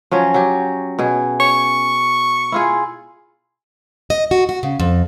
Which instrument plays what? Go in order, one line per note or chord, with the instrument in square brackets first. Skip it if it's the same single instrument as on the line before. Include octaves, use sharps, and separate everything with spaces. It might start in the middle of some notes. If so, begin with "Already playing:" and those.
[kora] F3 F#3 C#4
F#3 G4
B2 G#4
[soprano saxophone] C#6
[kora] E4 F4 G#4
[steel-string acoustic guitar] D#5
F#4
F#4
C#3
F2